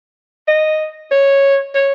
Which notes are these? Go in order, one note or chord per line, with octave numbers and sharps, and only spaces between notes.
D#5
C#5
C#5